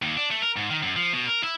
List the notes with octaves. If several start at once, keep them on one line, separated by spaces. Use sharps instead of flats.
D#2
D4
A3
A#4
G#2
D#3
F#2
F3
B2
A#4
E4